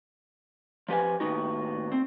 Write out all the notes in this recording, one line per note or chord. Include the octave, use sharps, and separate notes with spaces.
F3 G4 B4 G#5
D#2 A2 B3 D#4 F#4
C4